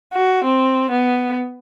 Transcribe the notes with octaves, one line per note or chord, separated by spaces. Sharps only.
F#4
C4
B3